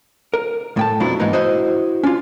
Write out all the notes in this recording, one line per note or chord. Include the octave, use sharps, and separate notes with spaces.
A#4
A2 G5 A5
F2 B2 F3 F#3 D4 E4
G#2 E3 A#3 B3 D#4
E4 F#4 C5 D#5
C#4 D4 F4